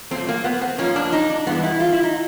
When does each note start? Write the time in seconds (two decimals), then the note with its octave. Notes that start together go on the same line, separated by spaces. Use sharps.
0.11 A#2 F#3 A3 C4
0.29 A#3
0.44 B3
0.61 C4
0.78 G#2 F3 A#3 C#4
0.96 D4
1.12 D#4
1.30 D4
1.47 G2 E3 G#3 B3
1.63 E4
1.80 F4
1.93 E4
2.03 D#4